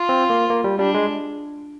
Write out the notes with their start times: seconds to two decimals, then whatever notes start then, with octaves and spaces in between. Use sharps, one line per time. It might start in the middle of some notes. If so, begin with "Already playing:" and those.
Already playing: F4
0.09 C4
0.30 A#3
0.50 A#3
0.64 G3
0.79 G3 D4
0.94 G#3